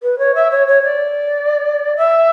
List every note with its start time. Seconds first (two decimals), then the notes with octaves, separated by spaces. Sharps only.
0.02 B4
0.18 C#5
0.35 E5
0.51 C#5
0.67 C#5
0.83 D5
1.96 E5